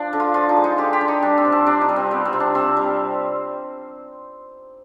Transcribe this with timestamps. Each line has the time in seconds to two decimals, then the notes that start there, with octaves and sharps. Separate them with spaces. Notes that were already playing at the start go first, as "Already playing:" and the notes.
Already playing: F3 D4
0.13 D3
0.20 F4
0.34 F3 F4
0.49 D#4
0.56 G#3
0.64 D#4
0.78 D3 G4
0.93 G4
1.01 D3
1.08 D#4
1.22 G3 D4
1.38 C4
1.45 C3
1.52 C4
1.66 C3 D4
1.81 D#4
1.89 G3
1.96 C4
2.11 G3 B3
2.25 C4
2.33 C3
2.40 D4
2.55 C3 C4
2.77 G3